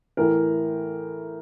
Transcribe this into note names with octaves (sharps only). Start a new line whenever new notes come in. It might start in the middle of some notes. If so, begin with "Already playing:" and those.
A2 E3 A#4